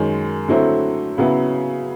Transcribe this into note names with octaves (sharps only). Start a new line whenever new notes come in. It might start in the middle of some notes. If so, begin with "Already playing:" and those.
Already playing: F#2 D#3 G#3
D3 F#3 A3 C4 E4
C#3 F#3 B3 E4